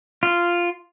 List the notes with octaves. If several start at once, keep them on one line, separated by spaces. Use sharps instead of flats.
F4